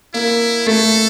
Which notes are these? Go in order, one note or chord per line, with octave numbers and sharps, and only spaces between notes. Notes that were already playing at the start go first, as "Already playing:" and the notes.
A#3 E4
A3 A4